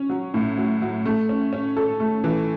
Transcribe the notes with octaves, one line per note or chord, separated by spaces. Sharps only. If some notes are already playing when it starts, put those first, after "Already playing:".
Already playing: C#4
F#3
A2
F#3
F#3
A3
C#4
C#4
A4
A3
E3